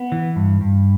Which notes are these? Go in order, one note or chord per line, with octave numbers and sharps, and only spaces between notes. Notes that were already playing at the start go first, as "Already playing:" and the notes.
Already playing: B3
E3
G2
G2